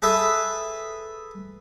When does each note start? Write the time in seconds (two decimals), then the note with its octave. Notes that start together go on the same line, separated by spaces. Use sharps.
0.02 G#4 A4 B4 E5 D#6